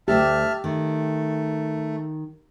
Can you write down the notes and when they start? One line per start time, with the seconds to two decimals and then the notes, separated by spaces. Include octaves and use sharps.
0.08 D2 A3 G4 E5 A5 F6
0.64 D#3 A3